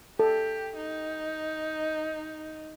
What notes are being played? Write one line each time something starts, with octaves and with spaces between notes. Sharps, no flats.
G4 A4
D#4